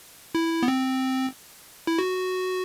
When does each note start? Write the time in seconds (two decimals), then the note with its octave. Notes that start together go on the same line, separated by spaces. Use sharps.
0.35 E4
0.63 B3
0.68 C4
1.87 E4
1.99 F#4